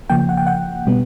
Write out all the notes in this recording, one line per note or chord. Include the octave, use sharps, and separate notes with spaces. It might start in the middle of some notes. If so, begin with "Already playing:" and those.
C#3 F3 A#3 G5
F#5
G5
F#5
B2 G3 B3